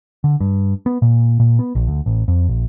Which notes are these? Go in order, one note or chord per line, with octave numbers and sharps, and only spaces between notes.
D3
G2
B3
A#2
A#2
B3
A#1
D2
A1
F2
A#1